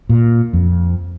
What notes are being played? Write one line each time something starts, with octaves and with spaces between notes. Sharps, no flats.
A#2
F2